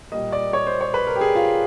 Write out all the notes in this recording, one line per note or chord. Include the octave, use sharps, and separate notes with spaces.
A#2 G3 A#3 D#5
D5
C#5
C5
C#5
B4
A#4
G4
G#4
F4